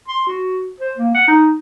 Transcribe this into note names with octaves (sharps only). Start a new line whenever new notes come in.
C6
F#4
C5
A#3
F#5
D#4